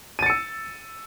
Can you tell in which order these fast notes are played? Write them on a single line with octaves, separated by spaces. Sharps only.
D#7 A6 C#7 E6